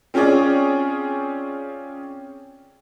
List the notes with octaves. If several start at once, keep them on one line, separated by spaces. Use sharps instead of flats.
C4 C#4 F4 G#4 C#5 D5